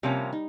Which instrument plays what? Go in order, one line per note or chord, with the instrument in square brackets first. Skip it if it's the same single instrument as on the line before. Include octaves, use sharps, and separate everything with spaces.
[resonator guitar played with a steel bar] C3 F3 A#3 C#4 [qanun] G3
[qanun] D#4